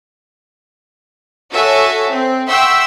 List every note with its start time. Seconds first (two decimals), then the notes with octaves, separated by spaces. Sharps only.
1.51 F#4 A4 C#5 E5 G#5
2.11 C4
2.49 E5 F#5 G5 C6 C#6 E6